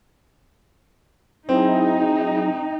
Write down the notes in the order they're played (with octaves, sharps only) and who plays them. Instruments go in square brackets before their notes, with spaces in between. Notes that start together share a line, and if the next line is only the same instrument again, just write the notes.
[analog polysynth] F#3 E4 G#4 [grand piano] C4 [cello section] D#4 [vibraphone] G5